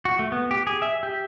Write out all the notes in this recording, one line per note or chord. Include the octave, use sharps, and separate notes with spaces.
F#4
A3
B3
G4
G#4
E5
G4